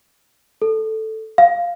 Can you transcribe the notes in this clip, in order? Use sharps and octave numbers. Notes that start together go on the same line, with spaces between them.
A4
F5